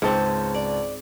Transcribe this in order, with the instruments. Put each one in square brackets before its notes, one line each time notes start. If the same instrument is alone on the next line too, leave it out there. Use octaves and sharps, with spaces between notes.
[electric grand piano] C#2 A5 [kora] G#2 C4 [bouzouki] C#4 C5
[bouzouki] D5